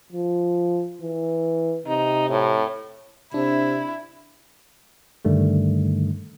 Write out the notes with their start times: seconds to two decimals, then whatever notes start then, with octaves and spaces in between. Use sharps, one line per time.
0.12 F3
1.02 E3
1.87 C3 D#4
2.29 A2
3.34 C3 D4 E4
5.25 G2 D3 D#3 G3 A3